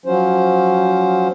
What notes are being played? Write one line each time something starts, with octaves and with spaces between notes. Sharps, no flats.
F3 F#3 C#4 C5